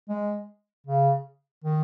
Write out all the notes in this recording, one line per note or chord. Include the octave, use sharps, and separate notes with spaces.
G#3
C#3
D#3